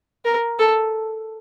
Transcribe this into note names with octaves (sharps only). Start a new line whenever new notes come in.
A#4
A4